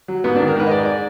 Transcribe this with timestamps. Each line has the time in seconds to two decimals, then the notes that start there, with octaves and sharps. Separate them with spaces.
0.08 F#3
0.24 G#2 B3
0.36 D4
0.40 D#3
0.48 A#4
0.56 G#2 B4
0.67 D#5
0.71 G#3 D5
0.85 D5